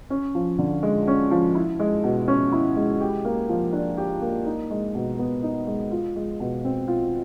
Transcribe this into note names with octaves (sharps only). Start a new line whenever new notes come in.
C#4
F3
D3
G#3
C#4
F3
E4
G#3
B2
C#4
E4
G#3
G4
A#3
F3
D4
G4
A#3
D#4
G#3
B2
B3
D#4
G#3
F4
G#3
B2
C4
F4